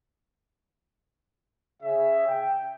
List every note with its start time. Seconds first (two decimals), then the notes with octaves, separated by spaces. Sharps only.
1.83 C#3 G#4 E5
2.27 G5